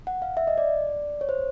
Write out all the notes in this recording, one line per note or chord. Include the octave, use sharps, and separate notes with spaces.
F#5
F5
E5
D#5
D5
C#5
C5